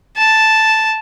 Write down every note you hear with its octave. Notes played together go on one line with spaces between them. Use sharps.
A5